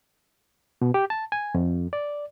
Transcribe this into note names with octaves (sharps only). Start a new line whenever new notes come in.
B2
G4
A5
G#5
F2
D5